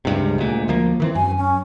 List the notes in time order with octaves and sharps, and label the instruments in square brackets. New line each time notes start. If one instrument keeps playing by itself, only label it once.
[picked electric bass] C#2 G2 C3 [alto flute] G#3
[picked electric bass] D2 A#2
D2 F3 A#3
D#3 E3 C4
[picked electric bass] F#2 [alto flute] G#5
[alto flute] C#4